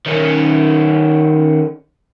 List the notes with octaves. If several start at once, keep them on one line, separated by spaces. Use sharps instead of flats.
D#3 C#4